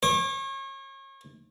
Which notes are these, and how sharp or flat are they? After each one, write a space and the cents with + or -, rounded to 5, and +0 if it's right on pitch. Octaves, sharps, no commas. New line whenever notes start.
C#5 -35 D6 +15